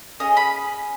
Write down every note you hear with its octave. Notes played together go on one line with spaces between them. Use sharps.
C#4 E4 G#4 D#5
B5